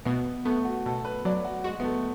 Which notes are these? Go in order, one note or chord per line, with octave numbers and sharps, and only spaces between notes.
B2 B3
A3 B3
F#4
B2 A4
B4
F#3 D5
F#4
G#3 F#4
B3
A3